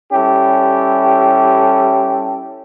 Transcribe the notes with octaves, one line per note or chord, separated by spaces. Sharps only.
G3 C#4 E4 G4 A4